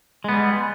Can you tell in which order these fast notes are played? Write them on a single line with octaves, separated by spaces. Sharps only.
G#3 B3 G3